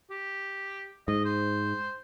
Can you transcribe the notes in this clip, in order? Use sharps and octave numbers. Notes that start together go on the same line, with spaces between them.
G4
G#2 D#5
C5